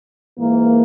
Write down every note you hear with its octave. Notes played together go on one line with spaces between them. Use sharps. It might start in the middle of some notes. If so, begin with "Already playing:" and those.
G#2 E3 A#3